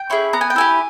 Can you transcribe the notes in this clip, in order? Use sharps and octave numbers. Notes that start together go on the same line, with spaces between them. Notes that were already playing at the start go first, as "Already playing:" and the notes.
Already playing: G5
C#4 E4 G#4
B3 A#5
G#5
G5
E4 G4 G#5